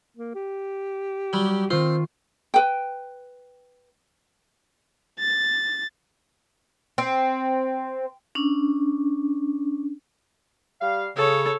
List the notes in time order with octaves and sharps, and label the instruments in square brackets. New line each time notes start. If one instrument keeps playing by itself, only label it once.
[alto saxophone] A#3
G4
[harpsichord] F#3 G3
[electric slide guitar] D#3 F4 [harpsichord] C4 [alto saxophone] C5
[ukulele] B4 G5
[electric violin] A6
[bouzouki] C4
[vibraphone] C#4 D4
[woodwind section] G3 F5
[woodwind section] C#3 [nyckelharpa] A4 C#5